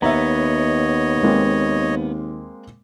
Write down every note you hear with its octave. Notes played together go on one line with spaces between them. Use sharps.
D#2 B3 C#5 D#5 E5 A#5
G#3 A#3 C4